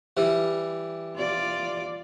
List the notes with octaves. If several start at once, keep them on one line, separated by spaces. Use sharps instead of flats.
E3 G3
F4 D5